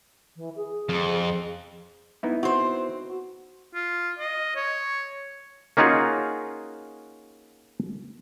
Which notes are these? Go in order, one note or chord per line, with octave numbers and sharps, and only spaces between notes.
E3
G#4
F2
B3 D#4 E4
C4 F#4 C5
F4
D#5
C#5
A#3 C#4 D#4 F4 F#4 G#4